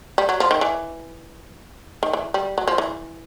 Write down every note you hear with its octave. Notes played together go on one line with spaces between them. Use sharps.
G3
F#3
F3
D#3
E3
D#3
E3
G3
F#3
F3
E3